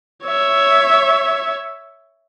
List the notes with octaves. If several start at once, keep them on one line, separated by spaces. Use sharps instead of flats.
C#5 E5